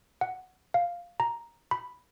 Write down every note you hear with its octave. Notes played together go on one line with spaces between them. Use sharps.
F#5
F5
A#5
B5